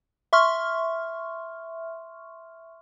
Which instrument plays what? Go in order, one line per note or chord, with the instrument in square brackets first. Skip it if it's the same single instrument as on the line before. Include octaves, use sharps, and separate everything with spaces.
[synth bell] E5 C6 C#6 F6